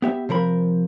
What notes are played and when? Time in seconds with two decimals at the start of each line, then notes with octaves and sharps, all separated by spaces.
0.02 B3 G4 E5
0.29 C3 F3 A#4 B5